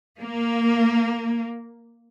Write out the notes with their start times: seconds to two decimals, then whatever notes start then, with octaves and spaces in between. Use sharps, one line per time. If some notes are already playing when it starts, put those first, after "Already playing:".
0.21 A#3